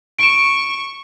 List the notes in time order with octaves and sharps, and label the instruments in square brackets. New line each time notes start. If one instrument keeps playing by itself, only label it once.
[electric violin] C#6 [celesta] D7 E7